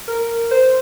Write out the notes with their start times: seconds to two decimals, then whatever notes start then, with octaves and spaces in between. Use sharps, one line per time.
0.08 A#4
0.51 C5